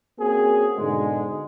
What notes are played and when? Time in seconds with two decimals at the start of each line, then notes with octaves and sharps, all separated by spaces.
0.19 A#3 C4 C#4 F#4 G#4
0.78 G#2 B2 D3 G#3